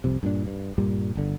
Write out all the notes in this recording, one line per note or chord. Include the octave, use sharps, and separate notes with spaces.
C2 F2 C3
G2 A#2 D4
G2
G2 A#2 G3
G1 D3